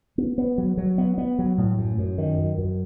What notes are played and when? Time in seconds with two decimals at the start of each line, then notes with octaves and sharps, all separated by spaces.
0.18 B3
0.38 B3
0.58 F#3
0.78 F#3
0.98 B3
1.18 B3
1.39 F#3
1.58 A2
1.78 F#2
1.98 F#2
2.18 D#3
2.38 F#2
2.58 F#2